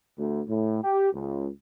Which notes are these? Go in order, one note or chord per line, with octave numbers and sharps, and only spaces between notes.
D2
A2
G4
C#2